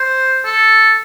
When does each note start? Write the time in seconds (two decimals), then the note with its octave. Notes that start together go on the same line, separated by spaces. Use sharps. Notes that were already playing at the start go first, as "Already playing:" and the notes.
Already playing: C5
0.44 A4